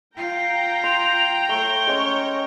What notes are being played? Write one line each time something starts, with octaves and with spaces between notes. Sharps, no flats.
F4 G5 A#5
C6 F7
A3 C#5 G7
G#3 C#4